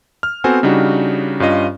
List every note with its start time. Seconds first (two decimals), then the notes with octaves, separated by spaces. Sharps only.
0.23 F6
0.44 B3 C4 F#4 A4 C5 G#5
0.63 C#3 G3 D4 D#4 F#4
1.40 G2 C#4 F4 D#5